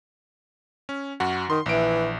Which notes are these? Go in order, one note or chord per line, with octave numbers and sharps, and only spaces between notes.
C#4
F#2 F#4 F#5
D#3 C6
A#1 E3 D7